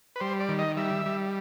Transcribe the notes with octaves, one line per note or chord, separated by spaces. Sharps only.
B4
G3 C5
D5
D#3
D#5
G3 E5
G3